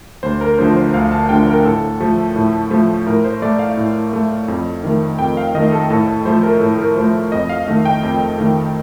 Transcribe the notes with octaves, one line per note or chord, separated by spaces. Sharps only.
D2 C5
A#4
D3 F3 A3 C5
C5
D2 F5
A5
D3 F3 A3 G5
A#4
A2 A4
F3 A3
A2
F3 A3
A2 A#4
C5
A3 D5
F5
A2
A3
F2
D#3 A3
F2 G5
F5
D#3 A3 D#5
A4
A2 A4
A4
F3 A3 C5
A#4
A2 A4
A#4
F3 A3 C5
F2 D#5
F5
D#3 A3 F5
G5
F2
D#3 A3